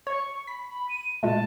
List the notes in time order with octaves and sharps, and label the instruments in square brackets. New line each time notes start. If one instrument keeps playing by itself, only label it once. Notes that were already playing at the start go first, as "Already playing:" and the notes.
[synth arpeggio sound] C#5 [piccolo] C#6
[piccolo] B5 [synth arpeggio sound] B6
[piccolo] B5
D#7
[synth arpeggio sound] A#2 G#3 A3 [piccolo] A5